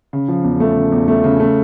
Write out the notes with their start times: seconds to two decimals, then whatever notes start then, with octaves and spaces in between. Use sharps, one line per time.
0.13 C#3
0.29 F3
0.44 E2
0.60 A3
0.77 C#3
0.92 E2
1.08 A3
1.24 C#3
1.40 A3